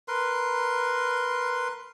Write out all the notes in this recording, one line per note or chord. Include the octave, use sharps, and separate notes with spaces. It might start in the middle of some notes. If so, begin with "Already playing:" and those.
A#4 B4 C6